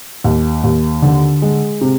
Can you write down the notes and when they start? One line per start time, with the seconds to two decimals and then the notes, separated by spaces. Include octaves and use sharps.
0.24 D#2
0.64 D#2
1.02 D3
1.42 G#3
1.81 C3